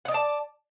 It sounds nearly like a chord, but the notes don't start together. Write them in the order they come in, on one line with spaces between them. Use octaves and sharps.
F#5 D#5 D5 A5